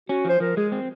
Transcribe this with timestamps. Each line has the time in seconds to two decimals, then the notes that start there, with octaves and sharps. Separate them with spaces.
0.09 C#4 F#4
0.25 F3 C5
0.40 F3 A#4
0.57 G#3 G#4
0.72 C4